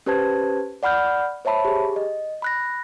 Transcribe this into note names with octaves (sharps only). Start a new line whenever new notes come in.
C#4 G4 B4 C5 A5 G#6
D5 F#5 B5 F6 G6
C5 C#5 E5 A5 B5
G4 G#4
D#5
B5 F#6 A#6